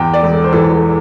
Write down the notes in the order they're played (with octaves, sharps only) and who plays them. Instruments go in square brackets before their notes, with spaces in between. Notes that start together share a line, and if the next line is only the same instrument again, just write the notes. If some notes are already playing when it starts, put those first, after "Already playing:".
Already playing: [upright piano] E2 G5
D5
E1
A4
C5
E3 A4